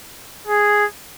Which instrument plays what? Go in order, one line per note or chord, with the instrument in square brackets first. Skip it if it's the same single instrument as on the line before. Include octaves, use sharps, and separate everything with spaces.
[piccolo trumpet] G#4